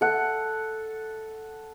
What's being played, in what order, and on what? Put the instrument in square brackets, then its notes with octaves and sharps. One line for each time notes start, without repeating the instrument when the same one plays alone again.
[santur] A4 F#5